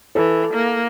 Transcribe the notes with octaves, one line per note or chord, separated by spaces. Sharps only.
E3 A4
A#3